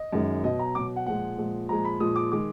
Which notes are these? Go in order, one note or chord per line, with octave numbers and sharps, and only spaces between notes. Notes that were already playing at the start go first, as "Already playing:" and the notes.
Already playing: D#5
F#2 D#3 G#3
B2 F#3 D#5
A#5
B2 F#3 D6
F#5
A#2 F3 G#3 F#5
A#2 F3 G#3
A#2 F3 G#3 A#5
B5
A#2 F3 G#3 D#6
D6
D#3 G#3 D6